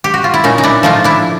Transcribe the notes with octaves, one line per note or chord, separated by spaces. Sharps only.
G4
F#4
F4
E4
A#2 C#4 D#4
D#4
D4 E4
F3 A3 D#4 F4
D4 E4